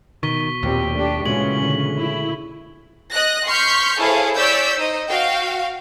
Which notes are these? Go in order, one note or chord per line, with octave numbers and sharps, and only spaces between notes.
B2 D#3 C#6 B6 G7
D#2 A#2 C4 G4
A3 D4 G4
A#2 C#3 E3 G#3 C#4 F#4 G#4 F#7
A#2 D3
E4
D#5 F#6 A#6
C6 C#6 F6 G6 B6
E4 G#4 A4 C5 C#5 F5
C#5 D5 E6 G6 B6
D#4 C5 D#5
F#4 F5 G5